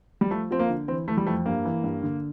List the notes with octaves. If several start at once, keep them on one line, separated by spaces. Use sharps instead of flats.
G3
F3 A3
F3 C4
A#3
D3
E3 C4
E3 A3
G3
F2 A3
G2 A#3
E3
G2
D3